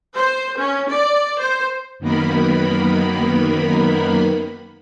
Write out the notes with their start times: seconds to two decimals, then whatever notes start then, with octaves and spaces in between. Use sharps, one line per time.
0.16 C5
0.59 C#4
0.90 D5
1.40 C5
1.99 F#2 D#3 A#3 B3 A#4 B5